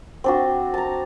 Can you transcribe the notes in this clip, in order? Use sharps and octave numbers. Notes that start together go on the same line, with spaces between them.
C4 D4 F#4
A5 A#5